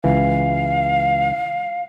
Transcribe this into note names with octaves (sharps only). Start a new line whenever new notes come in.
C#2 E3 F5